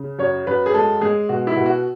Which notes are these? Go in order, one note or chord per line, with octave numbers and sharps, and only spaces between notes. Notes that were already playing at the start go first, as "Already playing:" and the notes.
Already playing: C#3
F#2 C#5
F#2 B4
G#4
G#3 A4
G#3 G#4
B2 F#4
E4
B2
F#4